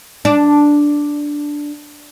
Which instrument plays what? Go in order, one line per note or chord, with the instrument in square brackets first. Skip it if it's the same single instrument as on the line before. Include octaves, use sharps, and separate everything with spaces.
[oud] D4